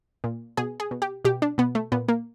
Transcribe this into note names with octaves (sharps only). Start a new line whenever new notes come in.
A#2
B2 G#4
G#4
B2
G4
B2 G4
D4
B2 B3
A3
A#2 B3
A#3